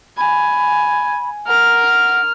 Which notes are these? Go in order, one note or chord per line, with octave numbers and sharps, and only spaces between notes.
G#5 B5
A#4 F#5 F6